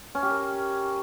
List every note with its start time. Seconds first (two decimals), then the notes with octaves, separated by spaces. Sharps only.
0.15 C#4
0.23 G4
0.31 A#4